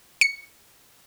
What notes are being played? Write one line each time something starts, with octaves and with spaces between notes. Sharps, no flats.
C#7